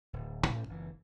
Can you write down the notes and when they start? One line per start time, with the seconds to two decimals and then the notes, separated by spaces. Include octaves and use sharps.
0.13 D1
0.47 G#2 C#4
0.69 F#1 E3